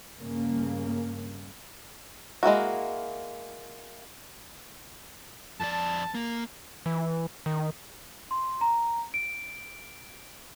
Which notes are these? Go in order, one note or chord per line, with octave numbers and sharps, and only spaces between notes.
G2 C#3 A#3 C#4
G#3 A#3 E4 F#4
F2 D5 A5
A#3
E3
D#3
C6
A#5
D7